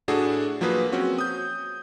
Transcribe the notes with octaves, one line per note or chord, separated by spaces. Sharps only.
A2 D4 F#4 G#4 A4
F3 F#3 A#3 G#4 B4
C4 C#4 F#4
D#6 G6